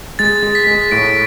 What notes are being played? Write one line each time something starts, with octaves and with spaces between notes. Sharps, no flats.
G#3 A6
G#3
B6
G#3
A2 D7